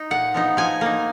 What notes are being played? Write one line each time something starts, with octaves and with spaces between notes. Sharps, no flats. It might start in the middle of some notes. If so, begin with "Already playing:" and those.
Already playing: D#4
A#2 F#5
F3 B3 D#4
F3 G#5
A#3 D#4